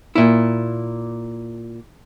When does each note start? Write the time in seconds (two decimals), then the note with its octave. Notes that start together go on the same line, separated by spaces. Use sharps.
0.15 A#2 E4